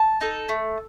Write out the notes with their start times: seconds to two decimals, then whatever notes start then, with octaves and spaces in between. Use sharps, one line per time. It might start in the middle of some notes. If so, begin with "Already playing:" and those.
Already playing: A5
0.21 D#4 A4
0.49 A3